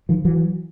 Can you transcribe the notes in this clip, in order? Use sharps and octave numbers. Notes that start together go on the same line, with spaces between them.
D#3 F3
E3 F#3